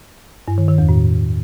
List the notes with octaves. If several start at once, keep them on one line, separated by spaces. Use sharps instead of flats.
G2
D#3
D#3
E2
A2